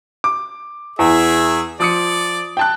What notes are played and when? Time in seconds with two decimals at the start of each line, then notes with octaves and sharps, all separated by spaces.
0.24 D6
0.99 E2 G#4 E5
1.80 F3 D5 D#6 C#7
2.57 G5 A5 F#6